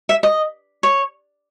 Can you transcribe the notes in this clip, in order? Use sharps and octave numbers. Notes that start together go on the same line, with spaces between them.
E5
D#5
C#5